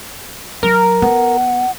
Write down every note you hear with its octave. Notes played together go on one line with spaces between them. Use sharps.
F#3 A#4
B3 F#5